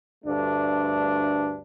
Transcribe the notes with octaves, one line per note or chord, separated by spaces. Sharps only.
D2 G2 A3 D4